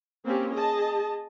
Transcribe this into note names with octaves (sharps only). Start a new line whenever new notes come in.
A#3 C4 C#4 G4
G#4 D#5 A5